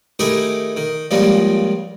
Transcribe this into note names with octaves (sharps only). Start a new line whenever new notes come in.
D#3 A3 D#4 E4 G4 G#4
D#3
C#2 G2 C#3 F3 G3 A#3